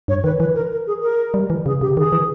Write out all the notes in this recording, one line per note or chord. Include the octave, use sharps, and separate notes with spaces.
G2 C#5
D#3 B4
E3 B4
A#4
A#4
G#4
A#4
G3
E3
C#3 G#4
C#3 G4
D#3 G#4
E3